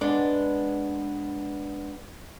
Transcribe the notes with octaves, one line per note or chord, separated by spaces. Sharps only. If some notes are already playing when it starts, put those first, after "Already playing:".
G#3 B3 D4